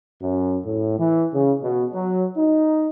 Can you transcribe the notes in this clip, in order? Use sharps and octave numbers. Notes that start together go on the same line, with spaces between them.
F#2
A2
E3
C#3
B2
F#3
D#4